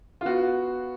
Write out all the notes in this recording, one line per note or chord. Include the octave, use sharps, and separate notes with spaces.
F4
B3 F#4